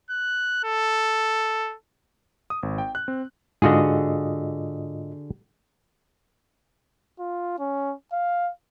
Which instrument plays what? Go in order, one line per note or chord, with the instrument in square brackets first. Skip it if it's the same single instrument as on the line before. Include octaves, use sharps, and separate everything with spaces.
[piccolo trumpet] F#6
A4
[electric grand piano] D#6
G#1
G5
F#6
C4
[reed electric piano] G#2 F4 D#5 [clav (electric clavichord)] D3 F#4 G#4
[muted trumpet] F4
C#4
F5